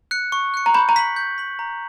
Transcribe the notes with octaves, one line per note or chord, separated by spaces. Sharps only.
F#6 C#7
C#6
F#6 C#7
A#5
B5 G6
A#5
B6 F#7
G6
B6 F#7
A#5